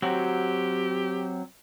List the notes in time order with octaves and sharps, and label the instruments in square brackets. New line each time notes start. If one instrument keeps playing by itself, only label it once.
[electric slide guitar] F#3 C4 F#4 [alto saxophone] G4